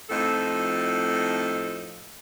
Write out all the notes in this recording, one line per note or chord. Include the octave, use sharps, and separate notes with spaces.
F2 A2 F3 D#4 A4